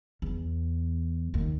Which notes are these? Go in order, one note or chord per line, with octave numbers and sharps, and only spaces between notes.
E2
D#2